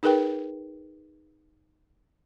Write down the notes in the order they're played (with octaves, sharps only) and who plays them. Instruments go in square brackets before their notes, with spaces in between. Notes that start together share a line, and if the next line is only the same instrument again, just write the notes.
[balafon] D#4 G#4 A#4 B4 G5